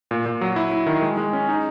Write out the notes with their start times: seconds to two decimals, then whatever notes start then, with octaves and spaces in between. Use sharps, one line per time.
0.11 A#2
0.26 A#2
0.41 F#3
0.56 E4
0.72 E4
0.86 D#3
1.02 G#3
1.17 G#3
1.33 C#4
1.49 D#4